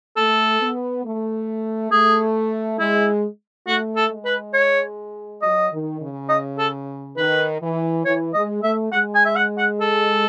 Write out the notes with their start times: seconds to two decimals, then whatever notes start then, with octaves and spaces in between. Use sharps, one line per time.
0.16 A3 A4
0.60 B3
1.04 A3
1.91 A3 G#4
2.79 G#3 E4
3.67 A3 F#4
3.96 A4
4.11 G#3
4.25 B4
4.54 C#5
5.42 F#3 D#5
5.71 D#3
6.00 C#3
6.29 D#5
6.58 A4
7.17 D#3 B4
7.61 E3
8.05 E3 C#5
8.33 G#3 D#5
8.63 A3 E5
8.92 G#3 F#5
9.15 G#5
9.25 E5
9.36 F#5
9.58 F#5
9.80 A4